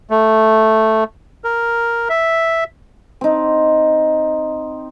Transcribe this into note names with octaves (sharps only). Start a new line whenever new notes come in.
A3
A#4
E5
C4 D#4